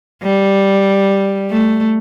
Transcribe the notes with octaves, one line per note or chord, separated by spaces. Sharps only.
G3
A3